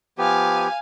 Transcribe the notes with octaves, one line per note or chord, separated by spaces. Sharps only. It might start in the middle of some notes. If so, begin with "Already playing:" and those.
F3 B3 G4 F5 G#5